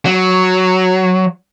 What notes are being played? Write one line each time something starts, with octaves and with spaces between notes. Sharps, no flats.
F#3